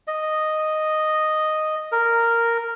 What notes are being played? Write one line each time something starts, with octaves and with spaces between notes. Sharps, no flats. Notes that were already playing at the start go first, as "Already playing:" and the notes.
D#5
A#4